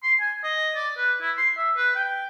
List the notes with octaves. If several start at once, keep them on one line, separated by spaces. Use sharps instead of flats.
C6
G#5
D#5
D5
B4
E4
C6
E5
B4
G5